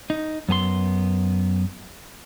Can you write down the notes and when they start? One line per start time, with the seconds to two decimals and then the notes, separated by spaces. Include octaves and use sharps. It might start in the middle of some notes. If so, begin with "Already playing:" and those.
0.10 D#4
0.49 F#2 B3 G#4 C6